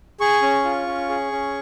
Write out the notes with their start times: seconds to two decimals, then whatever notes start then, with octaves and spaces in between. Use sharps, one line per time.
0.20 G#4 C#6
0.42 C#4
0.65 F4
0.87 C#4
1.10 G#4
1.32 C#4